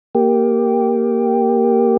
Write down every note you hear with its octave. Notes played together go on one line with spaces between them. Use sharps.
A#3 G4